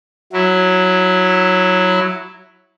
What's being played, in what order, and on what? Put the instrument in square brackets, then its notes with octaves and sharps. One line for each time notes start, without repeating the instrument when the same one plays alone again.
[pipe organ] F#3 E4